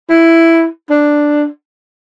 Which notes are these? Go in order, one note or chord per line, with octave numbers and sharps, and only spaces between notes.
E4
D4